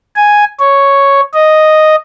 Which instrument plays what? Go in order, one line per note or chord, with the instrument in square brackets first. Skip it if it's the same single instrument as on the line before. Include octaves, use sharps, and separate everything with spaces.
[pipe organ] G#5
C#5
D#5